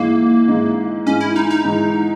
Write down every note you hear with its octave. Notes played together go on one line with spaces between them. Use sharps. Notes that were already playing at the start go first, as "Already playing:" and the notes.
Already playing: G#2 E3 G#3 A#3
G#2 E3 G#3
G#2 E3 G#3 C#4
E4
D#4
D#4
G#2 E3 G#3